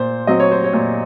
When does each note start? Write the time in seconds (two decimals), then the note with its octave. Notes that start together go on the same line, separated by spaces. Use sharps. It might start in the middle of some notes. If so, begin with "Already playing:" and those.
Already playing: A#2 C5
0.27 F#3 C4 D#5
0.40 C#5
0.51 C5
0.64 C#5
0.73 A#2